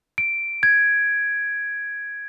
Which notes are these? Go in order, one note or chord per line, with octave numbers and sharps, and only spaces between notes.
D7
G#6